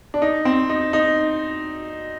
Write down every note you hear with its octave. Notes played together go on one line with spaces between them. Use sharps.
D4
D#4
C4
D#4
D#4